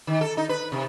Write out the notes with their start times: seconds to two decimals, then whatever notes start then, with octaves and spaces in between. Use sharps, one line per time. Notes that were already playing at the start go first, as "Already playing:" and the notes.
0.07 D#3
0.21 A4
0.37 D#4
0.49 B4
0.72 C3